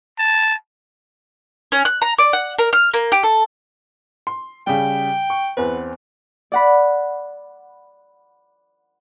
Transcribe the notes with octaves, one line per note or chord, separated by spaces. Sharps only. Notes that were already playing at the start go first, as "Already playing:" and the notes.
A5
C#4
F#6
A#5
D5
F#5
A#4
F6
A#3
G4
A4
C6
C#3 G3 G5
C#6
E2 B3 C4 B4
D5 F#5 B5